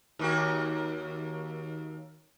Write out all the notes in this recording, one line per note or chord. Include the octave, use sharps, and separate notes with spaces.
D#2 A#3 F#4